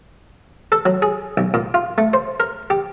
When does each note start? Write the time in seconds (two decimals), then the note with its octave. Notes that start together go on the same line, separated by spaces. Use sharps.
0.72 A4
0.86 F#3
1.02 G#4
1.37 B1
1.54 A#2
1.74 F4
1.98 A3
2.13 C5
2.40 A#4
2.70 G4